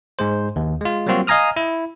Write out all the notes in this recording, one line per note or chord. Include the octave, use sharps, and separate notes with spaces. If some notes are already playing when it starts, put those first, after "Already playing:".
G#2 G#3 C5
D#2
G#3 F4
F#3 G3 A#3 C4 F4 F#4
D#5 F5 G#5 A#5 D#6 F6
E4